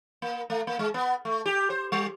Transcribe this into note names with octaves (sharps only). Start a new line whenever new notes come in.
A#3
A3
A#3
G#3
B3
A3
G4
C5
G3